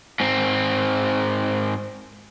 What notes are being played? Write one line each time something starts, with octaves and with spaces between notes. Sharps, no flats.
G#2 C4